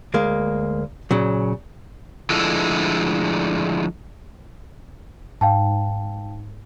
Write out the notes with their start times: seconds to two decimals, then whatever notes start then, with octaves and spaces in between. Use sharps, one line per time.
0.14 D2 G#3 A#3
1.11 A#2 C#3 F#3
2.30 D3 F3 G#3 A3 E4
5.41 G#2 F5 G5 A5